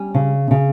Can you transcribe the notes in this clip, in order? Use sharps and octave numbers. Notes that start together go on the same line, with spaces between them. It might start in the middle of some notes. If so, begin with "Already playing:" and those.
Already playing: G3 C#4
C#3
C#3